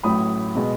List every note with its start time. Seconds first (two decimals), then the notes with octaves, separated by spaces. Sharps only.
0.03 A1 A2 F#3 B5 D#6
0.55 B2 G#3 B3